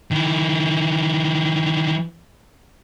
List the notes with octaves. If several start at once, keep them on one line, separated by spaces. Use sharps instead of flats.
D#3 E3